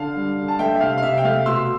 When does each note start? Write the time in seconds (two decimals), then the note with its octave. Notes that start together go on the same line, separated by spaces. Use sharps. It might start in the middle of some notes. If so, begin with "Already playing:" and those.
Already playing: D3 F5 A5
0.16 G3
0.38 D3
0.48 A5
0.59 A3 E5 G5
0.74 E5
0.80 C3 F5
0.98 F5
1.02 C3 E5
1.18 G5
1.24 A3 F5
1.46 B2 C6 E6